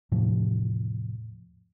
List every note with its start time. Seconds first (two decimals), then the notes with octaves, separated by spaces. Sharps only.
0.12 E2 A2 C3 F3